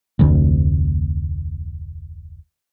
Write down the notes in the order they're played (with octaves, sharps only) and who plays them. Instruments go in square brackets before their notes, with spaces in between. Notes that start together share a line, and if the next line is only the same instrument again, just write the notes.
[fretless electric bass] F1 D2